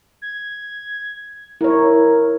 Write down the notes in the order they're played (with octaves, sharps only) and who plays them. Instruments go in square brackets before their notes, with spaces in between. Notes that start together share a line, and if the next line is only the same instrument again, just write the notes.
[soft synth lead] G#6
[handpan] E4 C#5 [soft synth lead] A#4